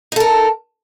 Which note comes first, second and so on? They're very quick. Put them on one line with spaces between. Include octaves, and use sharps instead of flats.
D#4 A4 A#4